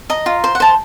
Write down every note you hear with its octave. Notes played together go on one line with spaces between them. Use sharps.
D#5 A#5
F4
C5
F#5
C5 A5